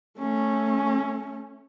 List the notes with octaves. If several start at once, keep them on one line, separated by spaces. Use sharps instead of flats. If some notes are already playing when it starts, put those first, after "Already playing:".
A3 C#4